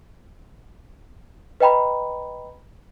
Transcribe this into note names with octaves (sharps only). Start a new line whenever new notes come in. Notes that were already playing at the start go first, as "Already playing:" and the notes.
B4 D#5 G5 A#5 B5